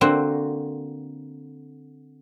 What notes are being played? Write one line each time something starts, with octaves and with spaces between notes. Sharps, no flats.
D3 A#3 C4 F#4